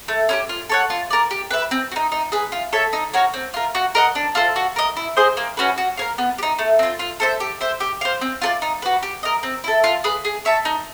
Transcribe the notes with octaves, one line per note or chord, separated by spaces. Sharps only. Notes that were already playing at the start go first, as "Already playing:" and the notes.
A3
C#4 E4 G4
F4
A4 C#5 F#5
F4
A#4 D5
G4
B4 E5
C4
F#4
D#4
D#4
G#4 B4
F4
A4 C#5 E5
D#4
F#4 A#4 C#5
C4
F4 A#4
F#4
A#4 D#5 F#5
D4
F4 A4 C5
F#4
A#4 D#5
E4
G#4 C5 D#5
A#3
C#4 F#4 B4
F#4
A#4 C#5 F5
B3
G4
D#4
A3
C4 F4
F4
A4 C5 E5
G4
C5 E5
G4
C5 F5
C4
F4 A4 D5
D#4
F#4 B4
G4
A#4 D#5
C4
E4 A4
F4
G#4 B4
G#4
C#5 E5 A5
D#4